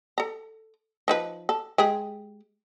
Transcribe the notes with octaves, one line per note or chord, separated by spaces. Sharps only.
A4 A#5
F3 D#4 B4
A4
G#3 G4 G#4